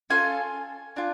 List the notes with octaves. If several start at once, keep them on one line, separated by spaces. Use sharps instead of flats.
C#4 F4 A4 G#5
D4 F4